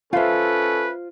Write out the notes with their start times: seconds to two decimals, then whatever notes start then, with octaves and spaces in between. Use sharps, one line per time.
0.13 C#4 F4 A4 B4 C5 E5 F5